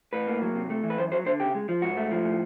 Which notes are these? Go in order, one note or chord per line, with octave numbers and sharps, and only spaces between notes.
A2 B4
A#3
F#3
C3
A3
E3
B4
F#2 C5
F#3 C5
D3 C5
C#3 G4
G#3
F3
G#2 F#4
A3
F3
A2